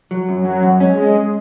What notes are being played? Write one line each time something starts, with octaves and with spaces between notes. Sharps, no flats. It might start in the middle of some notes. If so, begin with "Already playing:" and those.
F#3
F#2 F#3
F#2
F#2
G#3 C#4